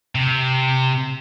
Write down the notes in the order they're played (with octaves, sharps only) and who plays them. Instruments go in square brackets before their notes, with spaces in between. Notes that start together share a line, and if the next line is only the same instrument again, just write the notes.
[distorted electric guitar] C3